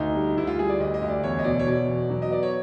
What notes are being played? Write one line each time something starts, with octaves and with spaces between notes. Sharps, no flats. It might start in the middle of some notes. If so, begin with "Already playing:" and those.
Already playing: D2 D#4
G3
D2 E4
F4
G3 G#4
D5
D2 D#5
D#5
D2
D5
E2 C#5
D#5
B2 D5
C#5
B2 D5
E2
F#3
D#5
B3 D5
C#5